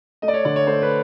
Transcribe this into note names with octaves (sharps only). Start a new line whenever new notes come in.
A3 D#5
D5
C#5
D3 D5
C#5
A3 C5
B4